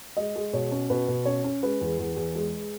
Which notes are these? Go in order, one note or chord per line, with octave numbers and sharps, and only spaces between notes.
G#3 D#5
G#3
B2 C#5
C#4
B2 B4
B2
C#4 C#5
C#4
G#3 B4
E2
E2
E2
G#3